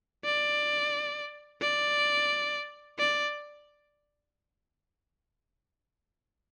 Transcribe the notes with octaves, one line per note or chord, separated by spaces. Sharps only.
D5
D5
D5